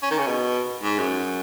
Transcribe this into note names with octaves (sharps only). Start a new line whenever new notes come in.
C#4
D#3
C#3
B2
G#2
F#2